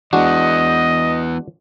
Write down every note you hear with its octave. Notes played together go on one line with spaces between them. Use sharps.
E3 G#3 B3 D4 F#4 D#5